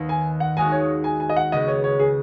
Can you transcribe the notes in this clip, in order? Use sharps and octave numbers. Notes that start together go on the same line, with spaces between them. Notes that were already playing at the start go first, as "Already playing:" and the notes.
Already playing: D#2 D#3 B3
G#5
F#5
D#2 D#3 G#3 D#4 F#4 G#5
C#5
G#5
G#5
D#5
F#5
C#2 C#3 B3 D#5
C#5
C#5
G#4